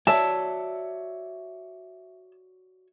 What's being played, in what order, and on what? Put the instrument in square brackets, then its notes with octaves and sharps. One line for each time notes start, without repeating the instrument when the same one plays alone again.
[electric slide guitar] F#4 C#5 D5 [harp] E5 [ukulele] A5